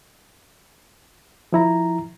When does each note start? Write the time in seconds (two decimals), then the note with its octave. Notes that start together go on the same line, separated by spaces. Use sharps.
1.53 F3 E4 A#5